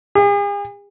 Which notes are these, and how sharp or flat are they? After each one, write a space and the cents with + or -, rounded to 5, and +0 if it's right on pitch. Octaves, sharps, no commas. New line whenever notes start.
G#4 -45